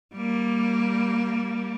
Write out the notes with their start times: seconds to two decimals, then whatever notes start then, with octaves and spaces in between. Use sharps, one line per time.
0.15 G3 A#3